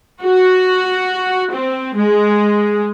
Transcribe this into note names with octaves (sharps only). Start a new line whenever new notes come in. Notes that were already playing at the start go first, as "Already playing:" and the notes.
F#4
C4
G#3